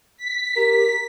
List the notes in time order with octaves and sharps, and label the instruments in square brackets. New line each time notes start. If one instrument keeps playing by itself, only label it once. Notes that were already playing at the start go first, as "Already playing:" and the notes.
[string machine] B6
[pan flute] G4 [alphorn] A#4